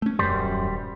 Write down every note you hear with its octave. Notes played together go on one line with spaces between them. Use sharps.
A3 C#4
D#1 F#2 G3 C5